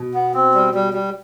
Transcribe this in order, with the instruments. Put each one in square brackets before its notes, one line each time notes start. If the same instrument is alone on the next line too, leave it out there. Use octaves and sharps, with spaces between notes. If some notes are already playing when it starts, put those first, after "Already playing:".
Already playing: [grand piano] B2
[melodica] B3
C4
G3
G3
G3